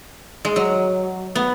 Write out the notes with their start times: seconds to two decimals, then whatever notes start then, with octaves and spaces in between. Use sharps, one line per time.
0.45 G#3
0.56 F#3
1.35 B3